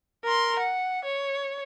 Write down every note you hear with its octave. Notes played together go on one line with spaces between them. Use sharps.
A#4 C6
F#5
C#5